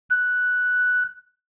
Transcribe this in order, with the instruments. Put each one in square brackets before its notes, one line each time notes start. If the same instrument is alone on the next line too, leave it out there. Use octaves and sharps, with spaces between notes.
[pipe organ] F#6